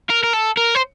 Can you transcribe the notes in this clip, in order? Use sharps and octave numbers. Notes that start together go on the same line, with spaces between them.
A#4
A#4
A4
A#4
C5